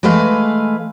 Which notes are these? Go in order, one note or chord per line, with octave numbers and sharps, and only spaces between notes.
E3 G#3 A3 B4 F5